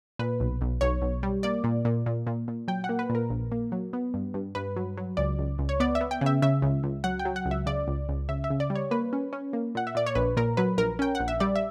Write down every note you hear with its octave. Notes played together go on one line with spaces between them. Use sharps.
A#2 B4
B1
B1
B1 C#5
B1
G3
A#3 D5
A#2
A#2
A#2
A#2
A#2
F#3 G5
F#5
A#3
B4
A#2
A#4
A#1
A#3
F#3
B3
G2
G2
G2 B4
F#3
F#3
C#2 D5
C#2
C#2
C#5
B3 D5
E5
B3
G5
C#3
E5
C#3 E5
C#2
C#2
F#3 F#5
G5
F#3
F#5
C#2
E5
C#3 D5
C#2
C#2
C#3 E5
E5
C#3
D5
G3
C#5
A#3 B4
C#4
C#4
A#3
A#2 F#5
E5
A#2 D5
C#5
A#1 B4
A#2 A#4
F#3 B4
A#1 A#4
C#4 G5
A#1 F#5
E5
G3 D5
E5